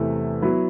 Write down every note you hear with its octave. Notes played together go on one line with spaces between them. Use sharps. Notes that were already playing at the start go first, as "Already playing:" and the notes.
Already playing: E2 C3 E3 A3
F#3 B3 E4